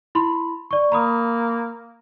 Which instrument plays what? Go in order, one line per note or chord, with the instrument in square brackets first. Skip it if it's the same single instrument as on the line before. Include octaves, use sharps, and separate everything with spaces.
[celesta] E4 B5 C6
D5 C#6
[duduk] A#3 [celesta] A#5 B5 D#6